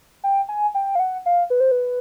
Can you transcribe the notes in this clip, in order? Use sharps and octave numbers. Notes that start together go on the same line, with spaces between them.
G5
G#5
G5
F5
F#5
F5
B4
C5
B4